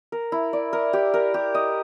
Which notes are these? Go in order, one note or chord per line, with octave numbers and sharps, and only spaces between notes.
A#4
E4
D5
A#4
G4
A#4
G4
D#5